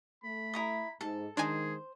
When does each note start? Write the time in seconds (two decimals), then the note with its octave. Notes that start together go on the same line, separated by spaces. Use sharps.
0.24 A3 B5
0.54 E4 A#5 D#6
1.01 G#2 A4
1.37 D#3 G#3 D4 D#4 G#4 C5 G#5